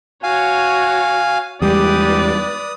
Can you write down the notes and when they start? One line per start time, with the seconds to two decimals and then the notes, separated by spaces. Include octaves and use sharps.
0.23 F#4 C#5 F5 G#5
1.62 E2 G3 G#3 G4 B4 D5 D#6